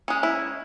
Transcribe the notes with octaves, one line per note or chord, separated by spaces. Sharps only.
G#3 C#4
E4